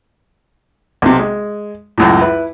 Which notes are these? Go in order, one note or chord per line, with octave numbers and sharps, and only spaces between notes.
B1 C3
G#3
C#2 F#2 A2
E4 B4